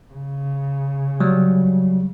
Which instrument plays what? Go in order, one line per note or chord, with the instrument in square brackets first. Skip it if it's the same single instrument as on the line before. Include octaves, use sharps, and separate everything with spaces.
[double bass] C#3
[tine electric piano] F#3 G3